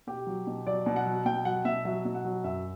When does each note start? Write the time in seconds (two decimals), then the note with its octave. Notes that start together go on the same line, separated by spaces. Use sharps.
0.07 B2 G4
0.27 F#3
0.47 B2
0.67 F#3 D5
0.86 B2
0.96 F#5
1.06 F#3
1.26 B2 G5
1.45 F#3 F#5
1.65 B2 E5
1.85 F#3 E5
2.05 B2
2.15 F#5
2.24 F#3
2.44 F#2 E5